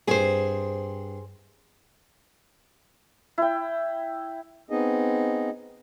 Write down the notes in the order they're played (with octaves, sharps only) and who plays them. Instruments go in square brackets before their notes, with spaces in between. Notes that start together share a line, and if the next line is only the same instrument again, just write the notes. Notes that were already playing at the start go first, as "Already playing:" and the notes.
[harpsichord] G2 C4 [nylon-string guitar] G#4 C5
[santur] E4 G5
[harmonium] B3 C4 D#4 G#4 D#5